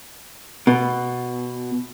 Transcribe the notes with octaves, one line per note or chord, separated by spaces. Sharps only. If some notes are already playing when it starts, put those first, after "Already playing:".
B2